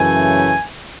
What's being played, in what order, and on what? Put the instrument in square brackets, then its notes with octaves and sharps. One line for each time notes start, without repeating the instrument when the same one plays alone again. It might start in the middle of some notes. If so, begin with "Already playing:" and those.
Already playing: [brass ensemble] F#2 C#3 E3 A3 G#5